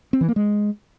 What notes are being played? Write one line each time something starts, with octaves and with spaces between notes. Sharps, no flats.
C4
E3
A#3
G#3